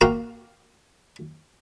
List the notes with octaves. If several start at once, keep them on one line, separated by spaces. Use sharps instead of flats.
A#3 F#4 F5 G5 A#5